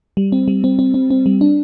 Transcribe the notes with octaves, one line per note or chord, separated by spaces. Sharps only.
G3
C4
G3
C4
C4
C4
C4
G3
D4